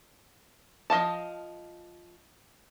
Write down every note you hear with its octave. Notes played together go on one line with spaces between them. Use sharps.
F3 D#5 F5 A5